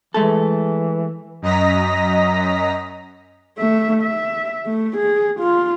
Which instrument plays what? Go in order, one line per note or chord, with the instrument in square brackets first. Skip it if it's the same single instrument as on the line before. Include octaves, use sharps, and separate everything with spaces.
[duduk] E3 [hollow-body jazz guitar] G#3 A3 A4
[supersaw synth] F#2 D#5 A#5 A#6 B6
[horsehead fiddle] A3 E5
E5
A3
G#4
F4